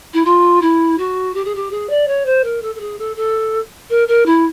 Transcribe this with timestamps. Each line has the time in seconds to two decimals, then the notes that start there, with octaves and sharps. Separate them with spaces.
0.13 E4
0.24 F4
0.61 E4
0.98 F#4
1.34 G4
1.44 G#4
1.55 G4
1.71 G#4
1.89 D5
2.07 C#5
2.25 C5
2.44 A#4
2.62 A4
2.75 A4
2.80 G#4
2.98 A4
3.16 A4
3.89 A#4
4.08 A#4
4.25 E4